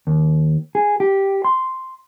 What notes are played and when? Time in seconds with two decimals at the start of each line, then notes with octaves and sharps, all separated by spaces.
0.07 D#2
0.75 G#4
1.00 G4
1.45 C6